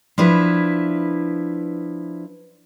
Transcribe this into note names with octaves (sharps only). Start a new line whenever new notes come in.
F3 D4 E4 B4